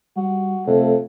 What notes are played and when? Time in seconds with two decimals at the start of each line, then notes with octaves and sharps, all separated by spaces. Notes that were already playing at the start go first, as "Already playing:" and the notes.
0.17 G3 F#4
0.67 F2 C3 A3